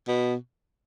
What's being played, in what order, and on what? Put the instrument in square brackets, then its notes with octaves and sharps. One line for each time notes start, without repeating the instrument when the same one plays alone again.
[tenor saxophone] B2